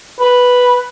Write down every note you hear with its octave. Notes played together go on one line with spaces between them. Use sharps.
B4